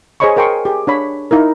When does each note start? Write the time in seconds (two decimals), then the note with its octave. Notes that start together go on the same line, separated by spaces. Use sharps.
0.20 G#4 C5 C#5 D#5 B5 C#6
0.36 G#4 A#4 G5 C6 C#6
0.65 G4 G#4
0.87 D4 C#5 B5
1.31 D#4 E4 A#4